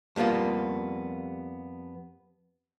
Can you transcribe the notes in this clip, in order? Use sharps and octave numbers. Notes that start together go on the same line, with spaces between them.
F2 G3 A#3 B3 F4